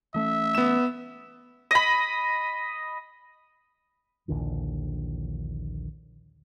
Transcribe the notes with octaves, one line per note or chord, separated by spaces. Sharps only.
E3 A3 C#4 E5
B3 E7
D#5 B5
A#1 D#2 D3 E3